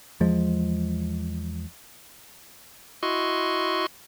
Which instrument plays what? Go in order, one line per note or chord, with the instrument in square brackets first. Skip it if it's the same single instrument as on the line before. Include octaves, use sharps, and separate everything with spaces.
[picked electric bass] E2 F3 G#3
[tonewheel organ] E4 F#4 D#5 C6 C#6